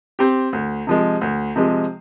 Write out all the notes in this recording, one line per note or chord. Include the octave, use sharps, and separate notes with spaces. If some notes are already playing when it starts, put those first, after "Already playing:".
C4 G4
D2
C3 F3 G#3
D2
C3 F3 G#3